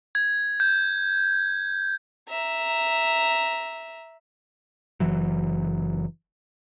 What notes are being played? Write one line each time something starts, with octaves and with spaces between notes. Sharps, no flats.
G#6
G6
E5 A#5
F#1 E3 F#3